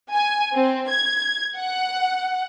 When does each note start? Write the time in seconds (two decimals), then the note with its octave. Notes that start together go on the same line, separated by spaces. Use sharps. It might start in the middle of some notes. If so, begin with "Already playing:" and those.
0.11 G#5
0.55 C4
0.89 G#6
1.57 F#5